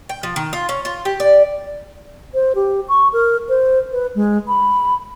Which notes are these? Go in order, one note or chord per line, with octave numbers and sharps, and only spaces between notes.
G5
F3
D#3
F4
C#4
F4
G4
D5
C5
G4
C#6
A#4
C5
B4
G#3
B5